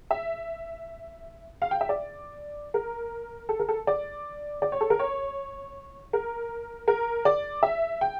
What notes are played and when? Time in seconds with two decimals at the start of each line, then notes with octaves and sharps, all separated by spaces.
0.11 E5
1.62 F5
1.71 G5
1.81 E5
1.89 D5
2.74 A#4
3.49 A4
3.59 A#4
3.68 A4
3.87 D5
4.62 D5
4.72 C#5
4.81 A4
4.90 A#4
4.99 C#5
6.13 A#4
6.88 A#4
7.25 D5
7.63 E5
8.01 G5